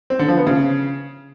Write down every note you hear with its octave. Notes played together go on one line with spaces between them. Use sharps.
C4
D3
F3
B3
C#3